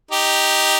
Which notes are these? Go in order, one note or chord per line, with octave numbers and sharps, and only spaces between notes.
D#4 G4